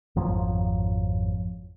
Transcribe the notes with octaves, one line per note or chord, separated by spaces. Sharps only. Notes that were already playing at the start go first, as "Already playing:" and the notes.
G#1 F2 F3 F#3